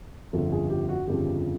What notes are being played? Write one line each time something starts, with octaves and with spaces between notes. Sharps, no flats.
G1 F2 C#3 F3 A4
G#4
G4
F#4
G1 F2 C#3 F3 G4